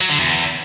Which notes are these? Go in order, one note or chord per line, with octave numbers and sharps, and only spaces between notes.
F#3
D3
E2